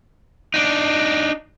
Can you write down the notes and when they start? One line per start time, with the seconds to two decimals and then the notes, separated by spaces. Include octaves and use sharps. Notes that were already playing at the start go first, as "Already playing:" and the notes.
0.54 D4 D#4